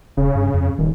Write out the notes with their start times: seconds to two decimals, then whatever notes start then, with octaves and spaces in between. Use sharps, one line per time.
0.17 E1 C#3
0.35 G2
0.54 F2
0.79 D#1 D#3